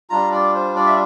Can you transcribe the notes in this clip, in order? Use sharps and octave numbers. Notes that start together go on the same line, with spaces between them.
G3 D4 F4 A#5
D5
C5
D5
E5